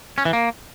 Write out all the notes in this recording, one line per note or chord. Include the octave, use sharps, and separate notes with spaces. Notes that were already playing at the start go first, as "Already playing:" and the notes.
C#4
E3
A#3